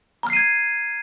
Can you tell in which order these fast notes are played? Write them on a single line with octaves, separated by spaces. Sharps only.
A#5 F6 C7 D#7 G#6